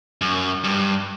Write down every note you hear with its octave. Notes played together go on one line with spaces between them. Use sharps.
F#2
G2